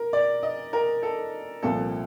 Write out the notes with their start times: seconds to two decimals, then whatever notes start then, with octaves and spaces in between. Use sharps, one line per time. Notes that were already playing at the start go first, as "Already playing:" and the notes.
Already playing: A#4
0.13 D5
0.43 D#5
0.73 A#4
1.03 A4
1.63 C2 A#2 F3 A4